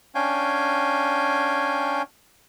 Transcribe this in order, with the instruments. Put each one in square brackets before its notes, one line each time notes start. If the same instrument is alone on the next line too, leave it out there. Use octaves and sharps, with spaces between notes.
[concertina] C#4 D4 F5 G5 G#5